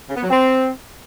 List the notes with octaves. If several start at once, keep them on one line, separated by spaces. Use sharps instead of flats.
C#3
B3
F#3
C4